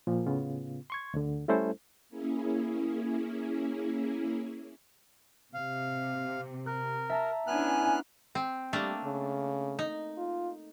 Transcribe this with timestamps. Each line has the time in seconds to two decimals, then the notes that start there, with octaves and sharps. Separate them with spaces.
0.07 A#2 F3
0.27 A2 C#3 B3 F4
0.90 C6 C#6 G#6
1.14 D2 D3
1.48 G3 A3 C#4 E4 A4 C5
2.09 A#3 C#4 E4 G#4
5.54 C3 F5
6.66 A#4 F#6
7.10 E5 A5 A#5
7.47 B3 C#4 D4 E4 G#5 F6 F#6
8.35 C4
8.73 G3 A3 A#3 D4
9.04 C#3
9.79 D#4
10.17 F4